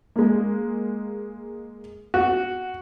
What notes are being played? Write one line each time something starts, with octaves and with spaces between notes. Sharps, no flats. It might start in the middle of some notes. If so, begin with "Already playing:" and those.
G#3 A#3
F#4